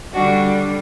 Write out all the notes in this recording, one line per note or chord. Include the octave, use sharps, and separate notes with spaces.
D3 G3 D4 F#4